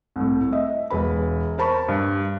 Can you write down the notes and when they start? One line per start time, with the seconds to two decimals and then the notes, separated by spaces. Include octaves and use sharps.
0.16 C2 A2
0.52 D#5 E5
0.90 E1 B4 B5
1.58 A#4 C5 A5 B5 C#6
1.88 G2